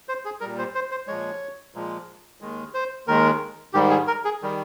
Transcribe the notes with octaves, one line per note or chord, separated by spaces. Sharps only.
C5
G#4
A#2 G3 A#4
C5
C5
C5
A#2 F3 G#3 C#5
A#2 F3 G#3
D#2 D#3 G#3
C5
D#2 D#3 G#3 A#4
G#2 D#3 G3 G4
G#4
A#4
G#4
D#3 G3